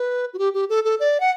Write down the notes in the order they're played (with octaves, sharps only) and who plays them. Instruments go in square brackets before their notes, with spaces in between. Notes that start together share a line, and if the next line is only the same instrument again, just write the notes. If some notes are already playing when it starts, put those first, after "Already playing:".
Already playing: [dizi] B4
F#4
G4
G4
A4
A4
D5
F#5